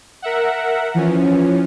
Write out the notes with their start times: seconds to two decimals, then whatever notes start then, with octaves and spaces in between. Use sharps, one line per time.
0.22 A#4 E5 F#5
0.94 E3 F3 C#4